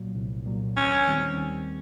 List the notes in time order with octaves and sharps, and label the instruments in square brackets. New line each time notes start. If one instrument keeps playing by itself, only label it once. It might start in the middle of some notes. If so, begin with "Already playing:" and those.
Already playing: [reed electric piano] C2 A#2 F#3
C2
A#2 F#3
[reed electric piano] D#2 [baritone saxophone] C#4
[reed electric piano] D#3 G3 C4
D#2